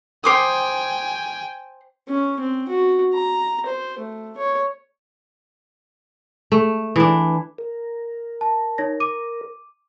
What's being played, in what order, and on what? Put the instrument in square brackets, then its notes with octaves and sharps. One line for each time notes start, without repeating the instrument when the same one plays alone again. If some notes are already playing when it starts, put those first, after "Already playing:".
[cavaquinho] C5 D6 D#6 [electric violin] G5 G#5
[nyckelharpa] C#4
C4
F#4
A#5
C5
A3
C#5
[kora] A3
E3 D4
[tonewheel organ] A#4
[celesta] A5
D#4 C#5 A#6
D6 D#7